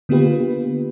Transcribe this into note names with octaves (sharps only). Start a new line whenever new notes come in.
D3 A#3 B3 F4 G4 B4